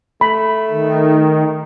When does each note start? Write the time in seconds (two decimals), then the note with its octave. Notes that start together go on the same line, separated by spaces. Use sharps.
0.21 A3 B5
0.70 D#3